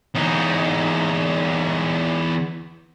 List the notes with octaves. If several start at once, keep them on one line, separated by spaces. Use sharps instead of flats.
E2 D#4